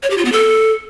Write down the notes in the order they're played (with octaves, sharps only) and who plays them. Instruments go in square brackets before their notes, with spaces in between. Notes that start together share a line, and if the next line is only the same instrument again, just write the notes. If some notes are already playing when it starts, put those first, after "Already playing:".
[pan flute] C#5
G4
F4
B3
A4